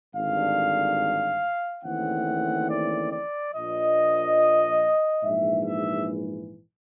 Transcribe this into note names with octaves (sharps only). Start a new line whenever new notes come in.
G#1 G2 D3 F5
D#2 C#3 E3 A3 C4 F#5
D5
D5
A#1 A#2 F3 D#5
A#1 G#2 E3 E5
E5